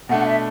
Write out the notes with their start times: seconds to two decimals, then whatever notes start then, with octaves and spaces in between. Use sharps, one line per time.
0.09 B2 A3 D4 F#5
0.25 E5